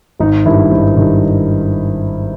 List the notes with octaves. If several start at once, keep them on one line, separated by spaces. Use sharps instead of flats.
G#1 D#4
G2 D#3 E4
G#1
G2 D#3